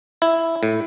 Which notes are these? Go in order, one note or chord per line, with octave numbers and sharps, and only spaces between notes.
E4
A2